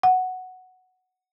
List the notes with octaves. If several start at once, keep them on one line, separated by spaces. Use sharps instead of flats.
F#5